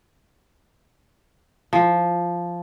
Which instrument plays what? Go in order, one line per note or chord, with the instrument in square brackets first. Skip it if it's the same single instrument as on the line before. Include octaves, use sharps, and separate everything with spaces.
[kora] F3